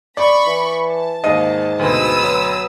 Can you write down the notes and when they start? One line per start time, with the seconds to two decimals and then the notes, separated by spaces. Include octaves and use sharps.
0.17 D5 B5 C#6
0.46 E3
0.89 A5
1.24 D#2 G#2 D#5 D#7
1.79 D2 B2 B4 D#6 E6
2.23 F#3